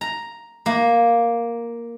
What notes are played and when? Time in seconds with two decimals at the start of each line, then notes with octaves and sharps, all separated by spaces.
0.01 A#5
0.66 A#3